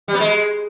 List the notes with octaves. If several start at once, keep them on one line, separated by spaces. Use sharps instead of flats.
G3
B3
G#3